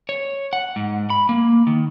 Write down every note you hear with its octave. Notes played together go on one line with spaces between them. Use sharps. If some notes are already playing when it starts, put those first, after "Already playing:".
C#5
F#5
G#2
B5
A#3
D#3